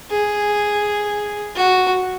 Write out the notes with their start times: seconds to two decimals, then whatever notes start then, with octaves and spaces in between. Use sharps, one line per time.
0.11 G#4
1.56 F#4